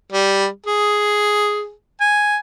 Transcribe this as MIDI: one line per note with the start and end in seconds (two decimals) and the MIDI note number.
0.12 0.47 55
0.66 1.71 68
2.01 2.37 80